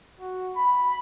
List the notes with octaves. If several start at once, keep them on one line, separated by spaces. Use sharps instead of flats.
F#4
B5